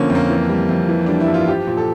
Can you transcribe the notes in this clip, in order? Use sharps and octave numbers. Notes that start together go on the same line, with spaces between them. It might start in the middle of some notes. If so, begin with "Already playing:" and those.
Already playing: D3 F3 A#3 C#4
F2
A#3
E3
G3
F2
E3
G3 D4
E4
G2
F4
F3 G4
A#2
A4